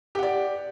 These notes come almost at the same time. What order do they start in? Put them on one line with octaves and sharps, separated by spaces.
G4 F#5 D5